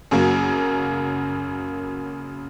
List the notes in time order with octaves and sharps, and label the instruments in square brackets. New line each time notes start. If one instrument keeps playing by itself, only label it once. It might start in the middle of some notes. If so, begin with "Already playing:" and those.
[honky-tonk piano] F#2 C#3 F#3 A#3